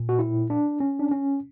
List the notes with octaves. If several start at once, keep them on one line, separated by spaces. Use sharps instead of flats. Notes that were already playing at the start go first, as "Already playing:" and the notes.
Already playing: A#2
F#4
E4
D4
C#4
D4
C#4